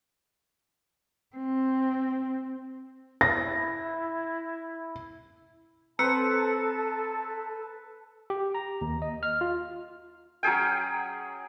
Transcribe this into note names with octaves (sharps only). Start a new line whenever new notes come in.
C4
E4 A#6
C4 A4 B4 C5 A5 A#5 E6 C#7
G4
A#5
D#2
D#5
F6
F4
F#3 C#4 G#4 G5